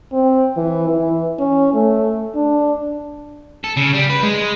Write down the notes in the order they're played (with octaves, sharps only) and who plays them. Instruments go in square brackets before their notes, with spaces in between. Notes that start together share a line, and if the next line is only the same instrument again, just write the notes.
[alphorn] C4
E3
E3
C#4
A3
D4
[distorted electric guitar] A4
C#3
G3
B4
G#3